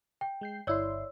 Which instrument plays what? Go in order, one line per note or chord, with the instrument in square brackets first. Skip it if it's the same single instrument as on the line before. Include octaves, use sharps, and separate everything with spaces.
[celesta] G5
[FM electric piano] G#3 G6 C7
[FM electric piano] G1 E4 C6 [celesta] C#5 D5 E6